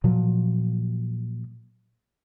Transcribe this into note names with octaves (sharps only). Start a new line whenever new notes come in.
A#2 F3 F#3